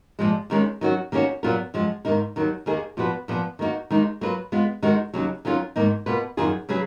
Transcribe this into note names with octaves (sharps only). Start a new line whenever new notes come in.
A#2 F3 G#3
D#2 D#3 G#3 C#4
D#3 F#3 C#4 F#4
D#3 A#3 C#4 F#4 C#5
A#2 F#3 B3 F4 A#4
F#2 F3 G#3
G#2 D#3 A#3 D#4 A#4
D#2 D#3 F#3
D#2 D#3 A#3 D#4 G#4
A#2 F3 B3 F#4 B4
A#2 F3 B3
D#3 A#3 D#4 F#4
D#2 D#3 G#3 D#4
F#3 A#3 F4 B4
G#3 B3 F4
D#3 G#3 D#4 F#4 A#4
D#2 C#3 F#3
D#3 F#3 C#4 F4 A#4
G#2 D#3 A#3 D#4
B2 A#3 F4 B4
F#2 D#3 A#3 F4 G#4
C#3 F#3 C#4 G#4 B4